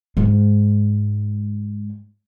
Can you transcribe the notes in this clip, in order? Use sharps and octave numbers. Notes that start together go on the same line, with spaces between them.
G#2 G#3